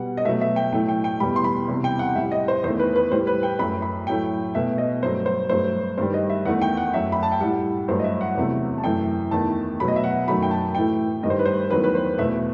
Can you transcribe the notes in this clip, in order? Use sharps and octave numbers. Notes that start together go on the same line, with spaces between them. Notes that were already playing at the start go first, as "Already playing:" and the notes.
Already playing: B2 G3 F#5
D#5
B2 F#3 A3 E5
E5
G5
A2 F#3 A3 G5
G5
G5
E2 B2 G3 B5
C6
B5
E2 C3 E3 G3
G5
F#5
A2 G3 E5
D#5
C5
E2 D#3 A3 C5
B4
B4
A2 E3 G3 C5
B4
G5
F#2 F#3 A3 B5
B5
A2 F#3 A3 G5
B2 A3 E5
D#5
G2 F#3 A3 C5
C5
G2 F#3 A3 C5
G2 D#3 G3 C5
D#5
E5
E2 D#3 A3 F#5
G5
F#5
F#2 F#3 A3 E5
B5
A5
G5
A2 G3 F#5
G2 F#3 A3 C5
D#5
E5
F#5
E2 C3 F#3 A3
A5
F#2 E3 A3 G5
E2 D#3 A3 A5
B2 F#3 A3 B5
D#5
E5
F#5
F#2 D#3 F#3 A3 B5
G5
A5
A2 E3 A3 G5
G2 D#3 G3 D#5
C5
B4
C5
E2 D#3 F#3 A3 B4
B4
C5
E2 B2 A3 E5